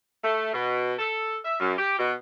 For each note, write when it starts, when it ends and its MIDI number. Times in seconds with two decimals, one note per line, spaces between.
0.24 0.53 57
0.54 0.94 47
0.99 1.37 69
1.44 1.58 76
1.60 1.73 42
1.78 1.99 67
1.99 2.14 47